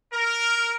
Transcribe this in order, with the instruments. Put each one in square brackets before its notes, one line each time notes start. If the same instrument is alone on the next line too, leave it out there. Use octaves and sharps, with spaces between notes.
[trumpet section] A#4